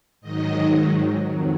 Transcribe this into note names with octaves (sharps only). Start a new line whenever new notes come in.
G#2 D#3 F#3 D#5
F2 D#3 F#3